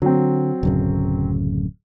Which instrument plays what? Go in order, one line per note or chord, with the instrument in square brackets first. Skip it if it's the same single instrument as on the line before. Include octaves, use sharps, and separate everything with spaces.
[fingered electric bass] D3 [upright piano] F#3 C4
[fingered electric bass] D1 F#2 C#3